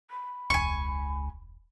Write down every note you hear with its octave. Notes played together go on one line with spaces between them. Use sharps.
B5
E1 C#2 G#5 C#6